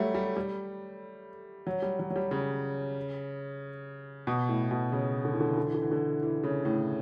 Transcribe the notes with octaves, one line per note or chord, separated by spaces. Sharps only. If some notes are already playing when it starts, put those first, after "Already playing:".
Already playing: F#3 G3 A3
G3
G3
F#3
G3
F#3
F#3
G3
C#3
B2
A2
B2
C#3
D3
E3
D3
E3
D3
E3
D3
E3
D3
E3
C#3
A2